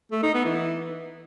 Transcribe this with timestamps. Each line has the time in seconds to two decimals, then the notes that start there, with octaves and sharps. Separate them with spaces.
0.12 A3
0.23 D#4
0.34 B3
0.45 E3